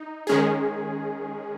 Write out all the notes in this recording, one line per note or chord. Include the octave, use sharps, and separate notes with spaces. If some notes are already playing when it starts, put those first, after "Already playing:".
Already playing: D#4
D#3 G#3 C#4 G#4